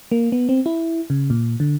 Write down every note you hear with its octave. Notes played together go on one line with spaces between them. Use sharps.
A#3
B3
C4
E4
C#3
A#2
D3